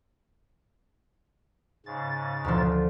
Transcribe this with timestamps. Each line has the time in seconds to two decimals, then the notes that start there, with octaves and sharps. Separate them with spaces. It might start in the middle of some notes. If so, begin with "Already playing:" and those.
1.86 G#2 C#3 A6
2.44 D2 F3